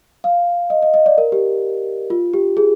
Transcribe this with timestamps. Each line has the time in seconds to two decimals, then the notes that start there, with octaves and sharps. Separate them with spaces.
0.24 F5
0.70 D#5
0.82 D#5
0.94 D#5
1.06 D5
1.18 A#4
1.32 G4
2.10 F4
2.33 G4
2.57 G#4